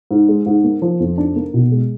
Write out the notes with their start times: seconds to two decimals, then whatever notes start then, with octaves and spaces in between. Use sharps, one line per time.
0.11 G#2
0.29 G#3
0.46 G#2
0.64 A#3
0.82 F3
1.00 F2
1.18 D4
1.36 A#3
1.54 B2
1.72 G#3